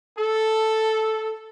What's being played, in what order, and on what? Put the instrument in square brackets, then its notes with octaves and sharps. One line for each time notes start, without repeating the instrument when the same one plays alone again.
[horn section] A4